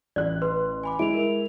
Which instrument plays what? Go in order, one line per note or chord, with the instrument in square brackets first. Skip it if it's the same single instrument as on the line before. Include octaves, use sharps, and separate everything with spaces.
[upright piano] A1 F#6 [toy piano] D5
[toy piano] B4 [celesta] C6
[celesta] G#5 B5 D6
[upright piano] G#3 E4 [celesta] D7 F7
[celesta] A#4 F7